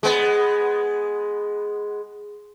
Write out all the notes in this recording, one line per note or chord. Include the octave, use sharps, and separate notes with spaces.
G#3 B3